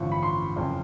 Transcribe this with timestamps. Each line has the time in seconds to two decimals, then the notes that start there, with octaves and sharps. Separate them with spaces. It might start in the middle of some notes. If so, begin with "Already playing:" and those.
Already playing: A1 G2 D3 F3 C#6
0.12 B5
0.23 C6
0.56 F#1 F2 C#3